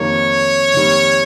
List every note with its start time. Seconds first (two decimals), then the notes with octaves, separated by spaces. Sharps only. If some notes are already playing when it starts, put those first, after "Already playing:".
Already playing: F2 D#3 G3 A#3 C#5
0.74 F2 D#3 G3 A#3